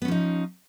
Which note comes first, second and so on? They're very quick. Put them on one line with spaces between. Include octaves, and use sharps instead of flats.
B3 C#4 F3 D#4